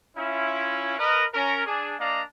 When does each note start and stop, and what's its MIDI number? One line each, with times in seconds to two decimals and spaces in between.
0.17 0.97 61
0.17 0.97 64
0.17 0.97 65
0.98 1.24 70
0.98 1.24 71
0.98 1.24 75
1.34 1.64 61
1.34 1.64 70
1.66 1.94 62
1.66 1.94 68
2.00 2.22 58
2.00 2.22 62
2.00 2.22 74
2.00 2.22 75
2.00 2.22 77
2.00 2.22 82